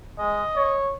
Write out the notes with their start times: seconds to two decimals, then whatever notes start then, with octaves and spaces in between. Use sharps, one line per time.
0.19 G#3 D#5
0.56 C#5